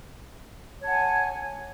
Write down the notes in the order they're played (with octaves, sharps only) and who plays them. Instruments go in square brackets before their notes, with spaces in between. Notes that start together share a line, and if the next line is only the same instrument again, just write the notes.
[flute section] C#5
A5
F#5
G#5